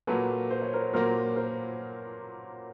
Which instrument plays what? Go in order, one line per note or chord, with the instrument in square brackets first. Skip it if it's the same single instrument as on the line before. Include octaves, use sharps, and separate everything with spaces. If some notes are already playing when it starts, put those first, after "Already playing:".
[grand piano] A#2 F#3 A#3 [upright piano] A4 B4
[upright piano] C5
C#5
A#4 C5
[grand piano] A#2 F#3 A#3 [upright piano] A#4 C5
[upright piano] A#4 C5